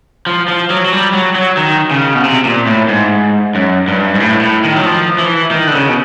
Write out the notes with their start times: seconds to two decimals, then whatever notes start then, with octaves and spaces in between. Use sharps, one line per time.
0.27 F3
0.48 F3
0.70 F#3
0.85 F#3
0.92 G3
1.14 F#3
1.36 F#3
1.57 D#3
1.91 C#3
2.15 B2
2.24 C3
2.45 A#2
2.67 A2
2.89 G#2
3.55 F#2
3.88 G2
4.15 G#2
4.20 A2
4.41 A2
4.64 D#3
4.75 F#3
4.86 F3
5.19 E3
5.51 D#3
5.67 D3
5.73 C#3
5.89 B2